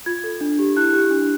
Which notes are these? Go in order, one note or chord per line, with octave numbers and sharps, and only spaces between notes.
F4 G#6
A4
D4
G4
E4 F#6
G4
D4